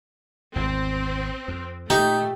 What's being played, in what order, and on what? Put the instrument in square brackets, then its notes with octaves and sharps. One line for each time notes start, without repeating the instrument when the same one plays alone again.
[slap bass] G#1 E2 [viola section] C4
[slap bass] F2
[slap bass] A#2 [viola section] A3 [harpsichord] D#4 [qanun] G4